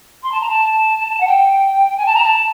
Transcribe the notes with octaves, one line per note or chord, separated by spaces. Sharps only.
C6
A5
A#5
A5
F#5
G5
G#5
A5
A#5
A5